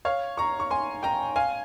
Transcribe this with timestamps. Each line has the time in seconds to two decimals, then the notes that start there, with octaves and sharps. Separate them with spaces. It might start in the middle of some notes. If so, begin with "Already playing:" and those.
0.05 C#5 F5
0.37 A#5 C#6
0.60 C#6
0.71 G#5 C6
1.03 G5 A#5
1.36 F5 G#5